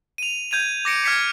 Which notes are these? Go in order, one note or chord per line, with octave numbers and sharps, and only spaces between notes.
D#7 F7
G6 G#6 D#7 F7
D6 A#6 C#7 D7
F6 G#6 B6 C#7